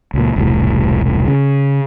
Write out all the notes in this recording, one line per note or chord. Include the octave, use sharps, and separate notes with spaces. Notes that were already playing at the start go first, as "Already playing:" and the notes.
C#2 A#2
E1 C2 A2
C#3